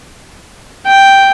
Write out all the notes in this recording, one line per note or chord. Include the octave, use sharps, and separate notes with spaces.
G5